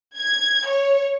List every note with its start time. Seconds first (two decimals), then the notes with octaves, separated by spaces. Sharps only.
0.18 G#6
0.66 C#5